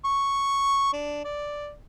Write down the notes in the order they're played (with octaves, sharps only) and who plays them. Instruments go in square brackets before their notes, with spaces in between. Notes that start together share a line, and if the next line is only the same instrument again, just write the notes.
[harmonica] C#6
D4
D5